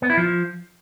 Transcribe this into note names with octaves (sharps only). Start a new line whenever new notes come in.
B3
E4
F3